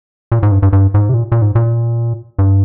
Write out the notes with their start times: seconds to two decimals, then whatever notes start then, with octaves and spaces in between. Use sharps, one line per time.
0.32 A#2
0.43 G#2
0.52 G2
0.62 G2
0.73 G2
0.94 G#2
1.09 C3
1.14 A#2
1.32 A#2
1.42 G#2
1.55 A#2
2.39 G2